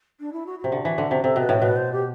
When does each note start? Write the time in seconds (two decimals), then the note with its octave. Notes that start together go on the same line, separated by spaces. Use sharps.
0.20 D4
0.32 E4
0.46 F#4
0.59 F#4
0.64 C3
0.72 D3
0.85 E3
0.98 D3
1.11 C3
1.24 C3 A4
1.36 B2 B4
1.49 A2
1.59 B2 B4
1.76 C5
1.92 G4